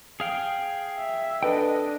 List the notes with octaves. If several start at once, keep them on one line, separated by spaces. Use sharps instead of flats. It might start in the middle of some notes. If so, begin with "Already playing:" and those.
G#4 F5 G5
E5
D4 A4 B4 D#5 G5